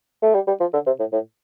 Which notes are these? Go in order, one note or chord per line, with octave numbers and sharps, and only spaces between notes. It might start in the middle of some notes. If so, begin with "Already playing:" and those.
A3
G3
G3
F3
D3
C3
A2
A2